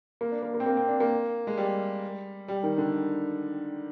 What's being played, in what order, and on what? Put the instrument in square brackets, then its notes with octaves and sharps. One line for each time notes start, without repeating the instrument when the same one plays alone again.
[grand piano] A#3
D4
A#3
A#3
C4
A#3
C4
D4
A#3
G#3
G3
G3
D#3
D3